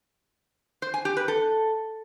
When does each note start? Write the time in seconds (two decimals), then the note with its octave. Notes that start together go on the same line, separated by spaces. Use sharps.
0.82 C5
0.94 G#5
1.05 G4
1.17 B4
1.28 A4